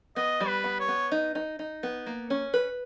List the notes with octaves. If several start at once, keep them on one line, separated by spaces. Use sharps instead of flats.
B3 D#5
G3
B4
B3
C#5
B3
D#4
D#4
D#4
B3
A#3
C#4
B4